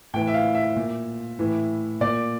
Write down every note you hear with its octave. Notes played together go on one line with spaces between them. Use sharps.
A2 E3 G5
E5
F5
E5
A#2
A2 E3
A#2 D5